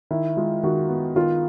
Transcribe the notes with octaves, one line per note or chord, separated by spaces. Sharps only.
D#3 E4
G#3 F4
D#3 F#4
B3
D#3 F4